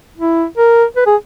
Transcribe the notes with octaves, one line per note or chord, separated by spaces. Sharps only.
E4
A#4
B4
G#4